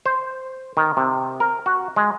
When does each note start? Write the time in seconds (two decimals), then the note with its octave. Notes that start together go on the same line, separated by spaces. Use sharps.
0.06 C5
0.77 D#3
0.97 C3
1.40 A#4
1.66 F#4
1.96 G#3